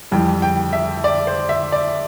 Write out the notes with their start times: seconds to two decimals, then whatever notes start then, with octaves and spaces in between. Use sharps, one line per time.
0.11 F2 E3 G3 G5
0.42 G5
0.73 E5
1.04 D5
1.27 C5
1.49 E5
1.72 D5